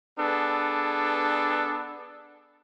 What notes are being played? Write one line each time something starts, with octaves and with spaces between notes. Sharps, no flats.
B3 D4 G#4 A4